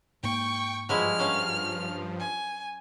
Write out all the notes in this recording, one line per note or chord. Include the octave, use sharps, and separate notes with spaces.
G#2 A#3 G5 C#6
G2 F3 F#3 G#3 E4 F6
F#3 C#4 F5
G#5